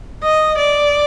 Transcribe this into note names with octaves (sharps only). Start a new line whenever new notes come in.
D#5
D5